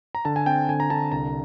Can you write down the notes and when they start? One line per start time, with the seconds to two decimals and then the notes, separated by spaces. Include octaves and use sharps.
0.15 A#5
0.25 D3 A5
0.36 G#5
0.46 C4 G5
0.69 D3 G#5
0.80 A#5
0.90 D3 A5
1.12 C2 A#5